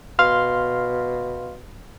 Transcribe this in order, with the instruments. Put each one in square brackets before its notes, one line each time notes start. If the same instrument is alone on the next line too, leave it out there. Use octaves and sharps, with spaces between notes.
[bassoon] B2 [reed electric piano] F5 C6 F6